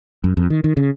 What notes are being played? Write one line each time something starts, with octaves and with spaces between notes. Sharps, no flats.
F#2
F2
D#3
D#3
C#3